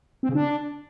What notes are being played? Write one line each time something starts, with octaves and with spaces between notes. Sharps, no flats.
C4
C#3
D4